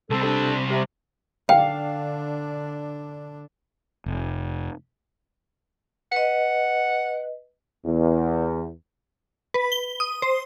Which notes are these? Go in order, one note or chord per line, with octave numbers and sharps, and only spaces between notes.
C2 C4 A4
G3 D4 A4
C3
D3 D4 F5 G5
F1
B4 D#5 F#5
E2
B4
G7
D#6
C5